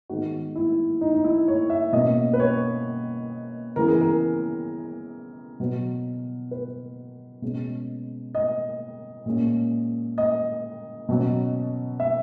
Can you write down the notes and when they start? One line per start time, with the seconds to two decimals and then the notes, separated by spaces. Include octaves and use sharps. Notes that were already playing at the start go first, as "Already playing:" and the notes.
0.09 G#2 D#3 G#3 B3 F#4
0.55 E4
1.01 D#4
1.14 D#4
1.24 E4
1.48 C#5
1.70 E5
1.93 B2 A#3 C#4 D#5
2.33 B4
2.40 C#5
3.76 C#3 E3 B3 A#4
3.88 G#4
4.01 A#4
5.60 B2 F#3 B3
6.51 B4
7.42 B2 G#3 C#4
8.35 D#5
9.26 A#2 G#3 C#4
10.18 D#5
11.09 B2 F#3 C#4
12.00 E5